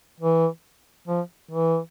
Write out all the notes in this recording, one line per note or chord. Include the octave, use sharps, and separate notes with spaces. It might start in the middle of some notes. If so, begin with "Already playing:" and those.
E3
F3
E3